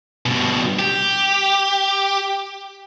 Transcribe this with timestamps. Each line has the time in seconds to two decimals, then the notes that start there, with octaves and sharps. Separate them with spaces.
0.26 G2 B2
0.79 G4